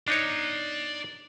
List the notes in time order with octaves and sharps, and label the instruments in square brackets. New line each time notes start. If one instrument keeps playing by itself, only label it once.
[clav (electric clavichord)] D4 D#4 C#5 [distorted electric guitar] D5 A#5